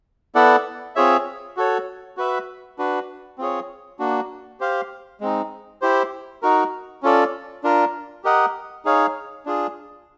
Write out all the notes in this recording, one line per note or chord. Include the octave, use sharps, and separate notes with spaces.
B3 E4 A4 D5 F#5
C4 F4 G#4 C#5 E5
F#4 A4 C#5
F#4 B4 E5
D4 F#4 B4
C4 F4 G#4 C#5
A#3 D4 F#4
G4 C5 F5
G#3 C4 D#4
E4 G4 C5
D#4 F#4 A#4
C#4 F4 A4 D5
D4 F4 A#4
G4 A#4 D#5 F#5
D#4 G#4 C#5 F5
D4 F4 G#4